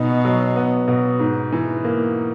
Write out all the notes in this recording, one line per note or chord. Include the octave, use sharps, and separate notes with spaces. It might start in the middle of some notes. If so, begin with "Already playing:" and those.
Already playing: B2 D#4
F#3
B3
B2
G#2
E3
A#3